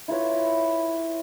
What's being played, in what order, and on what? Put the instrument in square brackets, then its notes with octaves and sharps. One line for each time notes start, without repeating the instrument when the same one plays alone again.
[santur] E4 F4 B4 C#5